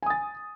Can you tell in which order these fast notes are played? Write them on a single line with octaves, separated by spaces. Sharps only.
G#5 D#6 A6